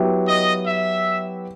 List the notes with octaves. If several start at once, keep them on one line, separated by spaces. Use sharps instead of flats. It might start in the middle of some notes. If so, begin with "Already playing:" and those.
Already playing: F#3 B3 E4 G4
D#5
E5